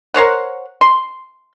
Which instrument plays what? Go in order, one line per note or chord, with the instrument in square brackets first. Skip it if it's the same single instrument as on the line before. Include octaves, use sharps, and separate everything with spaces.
[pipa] A#4 C5 C#5 F#5
C6